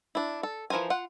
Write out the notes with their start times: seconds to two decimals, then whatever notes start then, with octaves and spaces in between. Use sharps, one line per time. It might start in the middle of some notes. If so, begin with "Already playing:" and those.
0.15 D4 E4
0.43 A4
0.70 E3 F3 A#4 C5 G#5
0.90 F4 F#5